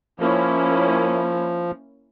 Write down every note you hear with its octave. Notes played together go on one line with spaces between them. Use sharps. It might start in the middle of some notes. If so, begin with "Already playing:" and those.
F3 A#3 C#4 E4